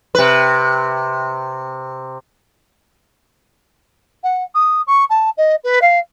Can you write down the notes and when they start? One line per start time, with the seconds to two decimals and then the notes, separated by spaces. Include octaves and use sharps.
0.15 C3 B4
4.23 F#5
4.55 D#6
4.87 C#6
5.10 A5
5.37 D#5
5.64 B4
5.82 F5